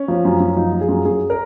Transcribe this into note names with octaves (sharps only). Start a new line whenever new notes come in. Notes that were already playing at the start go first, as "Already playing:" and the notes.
Already playing: C#4
F3
F#2
F#2
F3 D#4
F3
G#4
F#2
F#2 G#4
A#4